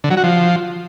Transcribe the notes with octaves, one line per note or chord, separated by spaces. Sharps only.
D3
F#3
F#4
F3